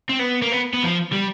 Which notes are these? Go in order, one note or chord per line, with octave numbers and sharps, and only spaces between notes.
C4
B3
A#3
B3
B3
F3
G3